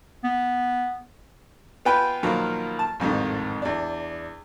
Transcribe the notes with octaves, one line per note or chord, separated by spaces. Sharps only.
B3
B3 F4 B4 G5 G#5 B5
B2 D#3 F3 F#3 A#3
A5
A1 F2 G#2 D#3
E2 D4